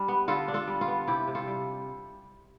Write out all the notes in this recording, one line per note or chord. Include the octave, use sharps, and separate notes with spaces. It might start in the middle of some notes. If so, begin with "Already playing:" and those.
Already playing: G3 D4
B3
D3 F4 A4
D4
F4 A4
G3
F4
B3
C3 E4 G4
C3
F4 A4
G3